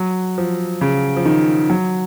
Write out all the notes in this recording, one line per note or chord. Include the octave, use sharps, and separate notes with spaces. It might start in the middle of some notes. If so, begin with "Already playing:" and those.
Already playing: F#3
F3
C#3
F3
D#3
F#3